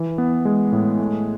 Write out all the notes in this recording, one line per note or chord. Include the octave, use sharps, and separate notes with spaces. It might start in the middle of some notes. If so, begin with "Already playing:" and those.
Already playing: E3
B3
G#3
A2
A3